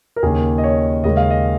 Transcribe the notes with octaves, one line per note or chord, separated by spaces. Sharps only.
A#4
D#2 C#3 A#3 C#4 G#4
D#5
C#5
D#2 C#3 G#3 D#5
F5
D#5